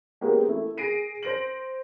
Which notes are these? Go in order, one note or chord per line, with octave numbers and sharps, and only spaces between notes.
G#3 A#3 B3 C#4 G4 A#4
A3 E4
G#4 A#6 C7 D7 D#7
C5 A#6 D7 F#7